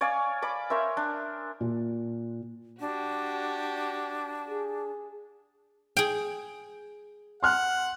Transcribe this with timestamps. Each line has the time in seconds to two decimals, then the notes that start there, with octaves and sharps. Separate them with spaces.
0.01 C#5 D5 F5 G#5
0.42 D5 B5 D6
0.70 A#4 C5 C#5 E5
0.97 D4
1.61 A#2
2.80 D4 F#4 G4
4.49 G#4
5.97 G#4 G5
7.43 F#5 C6 F6 F#6